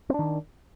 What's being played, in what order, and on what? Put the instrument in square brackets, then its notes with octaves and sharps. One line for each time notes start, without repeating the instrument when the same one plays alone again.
[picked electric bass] C4
D4
D#3